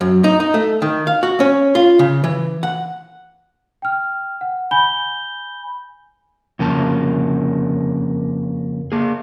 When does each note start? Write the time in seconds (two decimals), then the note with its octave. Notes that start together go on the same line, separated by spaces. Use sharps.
0.01 F#2
0.24 D#4
0.40 D#4
0.54 A3
0.82 D#3
1.07 F5
1.23 F#4
1.40 C#4
1.75 F4
1.99 C#3
2.24 E3
2.63 F#5
3.82 G5 F6
4.41 F#5
4.71 G#5 B5 G6 G7
6.59 F2 C#3 A#3 A5
8.92 A#3 G#4